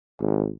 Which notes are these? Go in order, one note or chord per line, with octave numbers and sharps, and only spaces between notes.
G#1